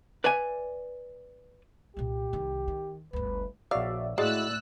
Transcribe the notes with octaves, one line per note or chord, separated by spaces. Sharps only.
B4 D5 E5 G#5
C2 A#2 G4
C2 D#3
D#3
G1 D2 B4
A#1 F#4 C#5 D5 E5 F5
A2 G#3 E4 F#4 D5 E6 F#6 A6